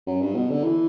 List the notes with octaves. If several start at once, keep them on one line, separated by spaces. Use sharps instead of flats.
F#2
G2
B2
D3
E3